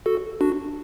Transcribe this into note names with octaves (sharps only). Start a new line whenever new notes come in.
F#4 A4
D4 F#4